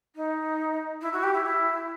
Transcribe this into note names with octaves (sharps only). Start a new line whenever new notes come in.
D#4
E4
F#4
G4
E4
E4